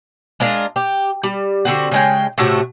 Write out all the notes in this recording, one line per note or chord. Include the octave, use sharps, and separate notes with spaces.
G#3 D4 F4 A#4
G4
G3
D3 C4 F#4
C#3 G#3 G5
A2 C3 A3 F#4